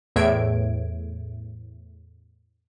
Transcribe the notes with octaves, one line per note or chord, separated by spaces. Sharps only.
E2 A2 E5 G#6 D7